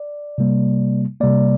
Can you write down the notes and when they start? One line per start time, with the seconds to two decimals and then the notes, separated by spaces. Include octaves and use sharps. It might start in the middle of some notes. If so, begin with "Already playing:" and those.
Already playing: D5
0.38 C3 G3 A#3
1.20 C3 G3 A#3 D5